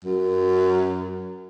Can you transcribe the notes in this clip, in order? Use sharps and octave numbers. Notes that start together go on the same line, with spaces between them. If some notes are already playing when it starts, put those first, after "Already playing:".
F#2